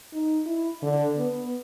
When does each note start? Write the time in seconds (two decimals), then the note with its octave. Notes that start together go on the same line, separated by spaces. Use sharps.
0.13 D#4
0.46 E4
0.82 D3
1.18 B3